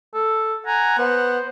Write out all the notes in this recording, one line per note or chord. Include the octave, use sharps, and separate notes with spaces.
A4
F#5 G#5 A#5
B3 C5